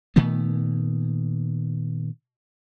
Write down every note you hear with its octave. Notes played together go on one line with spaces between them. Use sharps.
A#2 D#3 A3 B3